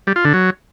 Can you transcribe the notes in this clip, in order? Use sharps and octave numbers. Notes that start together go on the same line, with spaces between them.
G3
F4
D3
F#3